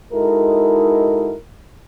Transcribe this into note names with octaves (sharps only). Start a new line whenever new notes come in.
G#3 D#4 E4 F#4 A4 A#4